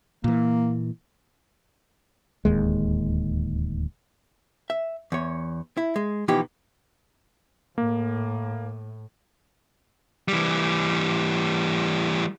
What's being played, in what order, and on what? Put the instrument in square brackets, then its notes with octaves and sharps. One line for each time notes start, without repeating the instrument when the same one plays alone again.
[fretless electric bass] A#2 E3 [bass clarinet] A#3
[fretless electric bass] D1 D#2 G#3
[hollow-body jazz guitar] E5
E2 C#5
E4
G#3
B2 E3 F3 B3 D#4 G4
[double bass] A2 [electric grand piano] A#3
[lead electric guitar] E3 G3